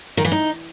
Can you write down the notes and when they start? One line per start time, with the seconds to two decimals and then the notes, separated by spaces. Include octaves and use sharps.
0.17 D#3
0.25 E3
0.32 D#4